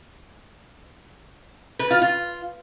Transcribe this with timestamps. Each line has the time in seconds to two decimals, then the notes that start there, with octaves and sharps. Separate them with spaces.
1.79 B4
1.91 F4
2.02 F4